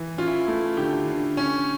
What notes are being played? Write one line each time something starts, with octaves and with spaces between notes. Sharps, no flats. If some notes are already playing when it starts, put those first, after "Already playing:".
Already playing: E3
C#4 F4
E4
A3 E4
D3 G4
D3
C#4